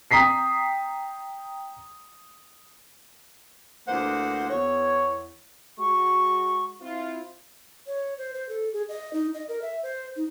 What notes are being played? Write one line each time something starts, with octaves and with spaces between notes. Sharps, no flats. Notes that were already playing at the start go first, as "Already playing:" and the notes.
G5 A#5 D#6 B6 C7
D2 E3 A#3 C5 F#5
E2 C#5
G#3 F#4 C#6
C4 E4 F4
C#5
C5
C5
A4
G#4
D#5
D#4
D#5
A#4
E5
C5
D#4